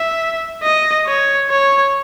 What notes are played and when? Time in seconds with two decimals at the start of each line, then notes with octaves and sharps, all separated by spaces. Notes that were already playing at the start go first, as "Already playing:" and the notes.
Already playing: E5
0.63 D#5
1.06 C#5
1.50 C#5